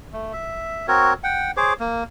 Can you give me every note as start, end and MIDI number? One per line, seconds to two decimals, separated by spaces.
0.13 0.33 57
0.33 0.86 76
0.88 1.14 60
0.88 1.14 66
0.88 1.14 70
0.88 1.14 73
1.24 1.51 78
1.24 1.51 79
1.57 1.73 68
1.57 1.73 72
1.57 1.73 73
1.57 1.73 86
1.80 2.04 58